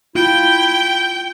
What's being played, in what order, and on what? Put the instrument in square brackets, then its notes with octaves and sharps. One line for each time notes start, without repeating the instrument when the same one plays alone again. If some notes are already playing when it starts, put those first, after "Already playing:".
[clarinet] E4 [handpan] F4 [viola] G5